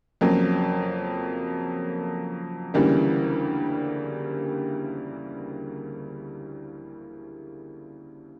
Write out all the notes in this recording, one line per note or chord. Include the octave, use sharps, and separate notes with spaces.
F2 C#3 F#3 A#3
D2 C#3 E3 G3 A#3